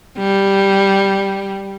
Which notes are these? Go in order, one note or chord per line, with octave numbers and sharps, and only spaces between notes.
G3